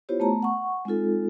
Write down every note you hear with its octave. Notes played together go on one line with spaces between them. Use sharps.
B3 E4 F4 G4 C5 C#5
A3 B3 A5 A#5
F#5 C#6
G#3 C4 D#4 F4 A4